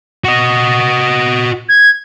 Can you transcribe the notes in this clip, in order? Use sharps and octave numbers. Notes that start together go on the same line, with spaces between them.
F#4 D#5
G#6